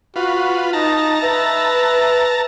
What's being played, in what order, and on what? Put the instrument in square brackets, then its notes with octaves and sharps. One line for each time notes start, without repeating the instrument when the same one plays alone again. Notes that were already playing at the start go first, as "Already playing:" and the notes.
[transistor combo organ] F4 B4 [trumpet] F#4
[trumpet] D#4 [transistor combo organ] A5 A#5
[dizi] B4 [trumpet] E5